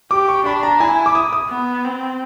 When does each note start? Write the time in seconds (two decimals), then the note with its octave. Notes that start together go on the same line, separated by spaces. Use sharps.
0.11 G4 D6
0.28 C#6
0.45 D4 B5
0.63 A#5
0.80 E4 G#5
1.06 D6
1.15 D#6
1.33 D#6
1.50 B3
1.85 C4